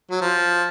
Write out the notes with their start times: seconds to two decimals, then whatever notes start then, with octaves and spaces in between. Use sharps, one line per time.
0.11 F#3
0.21 F3